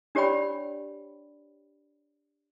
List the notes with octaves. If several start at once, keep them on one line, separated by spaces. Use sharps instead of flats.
D4 G4 C#5 D5 G5 B5